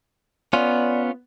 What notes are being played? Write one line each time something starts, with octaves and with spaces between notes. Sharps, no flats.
B3 C#4 F4 D5